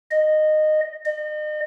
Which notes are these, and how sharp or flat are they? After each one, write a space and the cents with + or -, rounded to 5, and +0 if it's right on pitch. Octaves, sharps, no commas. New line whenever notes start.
D#5 -15
D#5 -40